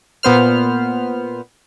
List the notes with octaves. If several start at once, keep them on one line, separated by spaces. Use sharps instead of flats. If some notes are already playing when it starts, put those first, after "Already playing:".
A#2 B3 C5 F6